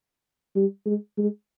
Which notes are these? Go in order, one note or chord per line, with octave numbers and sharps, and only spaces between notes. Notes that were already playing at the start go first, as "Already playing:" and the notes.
G3
G#3
G#3